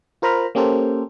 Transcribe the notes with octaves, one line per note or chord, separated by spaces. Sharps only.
F4 A#4 C5 A#5 B5 F6
A#3 C#4 G4 A4 A#4 C5